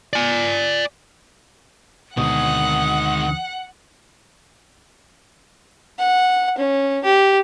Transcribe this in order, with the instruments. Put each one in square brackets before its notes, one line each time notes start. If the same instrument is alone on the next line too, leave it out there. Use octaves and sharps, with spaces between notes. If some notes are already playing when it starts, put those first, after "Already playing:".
[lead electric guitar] D5 G#5
[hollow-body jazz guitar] D2 B2 [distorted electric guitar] D#3 G#3 [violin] F#5 [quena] D#6
[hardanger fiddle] F#5
C#4
G4